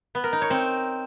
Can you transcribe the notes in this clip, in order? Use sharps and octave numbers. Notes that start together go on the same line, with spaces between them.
B3
A#4
D#4
C#5
C4